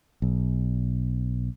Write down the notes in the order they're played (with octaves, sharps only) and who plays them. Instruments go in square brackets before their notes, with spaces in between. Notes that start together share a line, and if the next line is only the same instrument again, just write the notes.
[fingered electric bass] B1